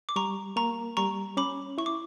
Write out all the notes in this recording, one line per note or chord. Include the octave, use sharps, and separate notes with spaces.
D6
G3 A#5 C#6
A#3 A#5 C#6
G3 A#5 C#6
C#4 B5 D6
E4 C#6
D6